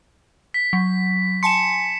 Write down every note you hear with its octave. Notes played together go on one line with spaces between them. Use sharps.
B6
F#3
G#5 A5 C6 C#7 E7